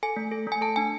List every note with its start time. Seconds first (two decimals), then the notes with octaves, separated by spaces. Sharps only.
0.03 A4 G#5
0.16 A3
0.31 A4
0.47 A3 G#5
0.61 A4 A5
0.76 D4 G#5